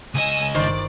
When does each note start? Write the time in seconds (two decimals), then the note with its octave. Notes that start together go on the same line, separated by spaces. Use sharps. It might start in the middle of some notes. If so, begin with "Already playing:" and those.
0.15 C#2 D#5 G#5 D#6 E6
0.55 G1 D#3 C5 D5